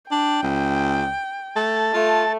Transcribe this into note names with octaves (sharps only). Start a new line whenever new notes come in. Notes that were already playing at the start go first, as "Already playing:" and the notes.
D4 G5
C#2
A3 A4 A5
A3 F4